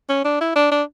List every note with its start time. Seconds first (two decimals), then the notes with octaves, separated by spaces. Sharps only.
0.09 C#4
0.25 D4
0.41 E4
0.56 D4
0.72 D4